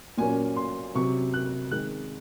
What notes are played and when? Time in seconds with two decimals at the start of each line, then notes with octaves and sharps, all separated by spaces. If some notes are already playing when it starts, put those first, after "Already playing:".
0.17 A#2 F#3 A#3 C#4 G#5
0.56 C6
0.95 C3 F#3 C4 C#6
1.34 F#6
1.71 D#3 G#3 C4 F#6